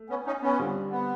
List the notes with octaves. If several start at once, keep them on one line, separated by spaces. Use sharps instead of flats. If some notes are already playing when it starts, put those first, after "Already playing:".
Already playing: A3
B3 C#4
C#4 D#4
B3 C#4
D3 G3 C4 F4
B3